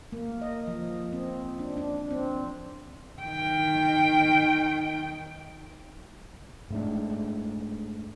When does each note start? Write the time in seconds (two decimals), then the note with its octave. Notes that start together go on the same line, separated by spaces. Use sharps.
0.12 A#3
0.42 D#5
0.67 F3
1.13 C4
1.59 D4
1.77 D4
2.11 C4
3.23 D#3 G5
6.70 G#2 A3 D4